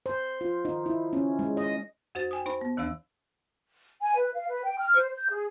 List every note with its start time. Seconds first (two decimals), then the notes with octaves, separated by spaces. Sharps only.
0.06 C5
0.41 F4
0.65 D#4
0.86 E4
1.13 C#4
1.39 G#3
1.57 D#5
2.15 F2 F#4 C5 A6
2.31 G5 G#5 D#6
2.46 D#4 C5 B5
2.61 B3
2.77 D#2 E3 D4 F5 E6
4.01 G#5
4.16 B4
4.34 F5
4.49 B4
4.64 G5
4.79 F6
4.95 C5
5.13 G6
5.30 G#4